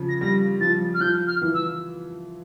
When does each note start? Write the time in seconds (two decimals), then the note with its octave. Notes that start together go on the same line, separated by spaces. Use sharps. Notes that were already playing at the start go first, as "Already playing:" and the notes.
Already playing: C#3 F3
0.09 A#6
0.21 G3 A#6
0.61 F3 A6
0.94 F6
1.01 F3 G6
1.27 F6
1.42 E3
1.54 E6